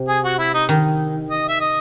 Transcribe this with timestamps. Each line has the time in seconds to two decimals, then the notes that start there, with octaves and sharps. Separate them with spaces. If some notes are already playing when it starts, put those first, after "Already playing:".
Already playing: C3
0.08 G#4
0.25 F#4
0.39 E4
0.54 D#4
0.69 D#3
1.30 D#5
1.49 E5
1.60 D#5